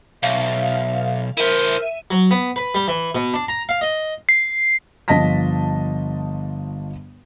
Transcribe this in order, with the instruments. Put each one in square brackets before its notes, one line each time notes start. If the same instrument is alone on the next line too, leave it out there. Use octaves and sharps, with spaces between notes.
[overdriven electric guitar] B1 [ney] E5 [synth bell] F5
[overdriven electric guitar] E4 C5 [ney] A#4 [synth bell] E5 D#7
[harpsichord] F#3
B3
B4
G3
E3
B2
D4
A#5
F5
D#5
[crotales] C7
[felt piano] G1 F3 D#5 A5 A#6 B6